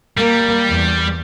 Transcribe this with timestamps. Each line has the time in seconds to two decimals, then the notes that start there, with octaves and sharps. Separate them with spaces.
0.17 G3 A#3
0.68 E2